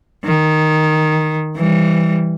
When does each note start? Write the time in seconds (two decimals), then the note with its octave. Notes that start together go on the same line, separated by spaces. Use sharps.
0.25 D#3
1.56 E3 G3